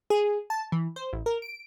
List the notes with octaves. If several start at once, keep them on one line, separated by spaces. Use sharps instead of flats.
G#4
A5
E3
C5
A1
A#4
D7